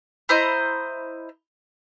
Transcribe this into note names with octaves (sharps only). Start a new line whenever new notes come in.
E4 C5 D#5 A#5